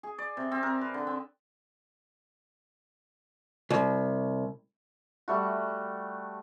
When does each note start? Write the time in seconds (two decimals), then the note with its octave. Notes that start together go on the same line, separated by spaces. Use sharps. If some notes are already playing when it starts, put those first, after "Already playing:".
0.03 G#4
0.18 D5
0.37 C3
0.51 C4
0.63 A#4
0.81 B4
0.94 D3
1.07 C4
3.70 C2
5.28 G3 A3 F#4